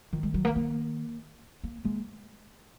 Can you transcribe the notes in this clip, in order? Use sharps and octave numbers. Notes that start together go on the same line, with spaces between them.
D#3 F3
G#3
F#3
A#3
A#3
A#3
G#3 A#3